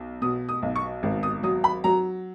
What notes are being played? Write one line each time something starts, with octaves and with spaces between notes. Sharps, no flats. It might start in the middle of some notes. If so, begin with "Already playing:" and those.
Already playing: B1
B2 D#6
D#6
B1
C#6
G#1
D#6
F#3 D#6
B5
F#3 A#5